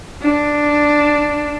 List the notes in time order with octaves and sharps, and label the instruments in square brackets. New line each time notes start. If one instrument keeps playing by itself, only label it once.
[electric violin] D4